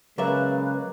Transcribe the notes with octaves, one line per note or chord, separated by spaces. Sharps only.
C#3 F#3 G#3 A#3 B4 D5 E5 F5